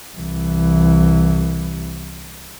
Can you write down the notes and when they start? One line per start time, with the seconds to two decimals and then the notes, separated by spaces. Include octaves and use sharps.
0.17 C2 E3